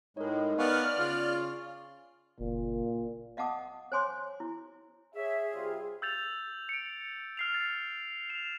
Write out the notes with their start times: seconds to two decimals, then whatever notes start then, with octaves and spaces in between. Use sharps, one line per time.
0.17 A2 G#3 D#4 A#4 C#5
0.58 B3 D5 F5 G#5 C#6 F6
0.99 C#3 F4
2.40 F#1 A#2
3.37 D#5 F5 F#5 A5 D6 D#6
3.92 C5 C#5 G#5 C6 D6
4.40 E4
5.15 G#4 C#5 E5
5.54 C3 G3 F4
6.02 E6 G6 A6 F7
6.69 C#7 D7
7.37 F6 C7 F7
7.54 A6
8.30 E7 F7